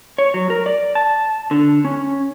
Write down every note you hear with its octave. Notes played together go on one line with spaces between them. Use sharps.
C#5
F#3
A#4
D5
A5
D3
C#4